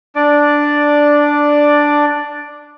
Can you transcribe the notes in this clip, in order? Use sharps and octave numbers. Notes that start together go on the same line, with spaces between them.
D4 D5